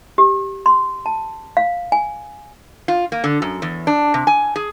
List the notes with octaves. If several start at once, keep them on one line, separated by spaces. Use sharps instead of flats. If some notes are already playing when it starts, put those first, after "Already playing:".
G4
C6
A5
F5
G#5
F4
A#3
D3
F#2
E2
D4
C3
G#5
G#4